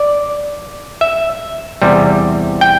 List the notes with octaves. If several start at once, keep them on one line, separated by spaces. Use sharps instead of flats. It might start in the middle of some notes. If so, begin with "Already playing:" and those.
Already playing: D5
E5
E2 C3 G3
G5